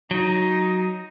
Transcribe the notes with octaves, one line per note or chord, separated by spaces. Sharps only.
F#3 D#4